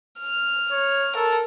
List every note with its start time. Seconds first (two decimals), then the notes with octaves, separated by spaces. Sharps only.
0.19 F6
0.71 C#5
1.15 A4 A#4